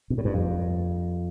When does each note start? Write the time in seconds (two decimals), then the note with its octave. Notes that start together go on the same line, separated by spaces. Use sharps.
0.10 B2
0.18 A2
0.25 G2
0.34 F2